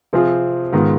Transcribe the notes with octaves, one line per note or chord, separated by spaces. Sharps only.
C3 F3 C4 F4 G#4
G#2 D#3 B3 F4